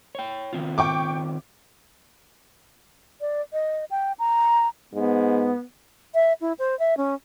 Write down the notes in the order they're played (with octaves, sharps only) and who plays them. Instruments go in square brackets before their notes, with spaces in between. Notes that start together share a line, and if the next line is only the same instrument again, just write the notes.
[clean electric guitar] C#5 G5
D#3 C4 F4
[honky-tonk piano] G5 C#6 D6
[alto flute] D5
D#5
G5
A#5
[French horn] G#2 [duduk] B3
[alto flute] E5
E4
C5
E5
C#4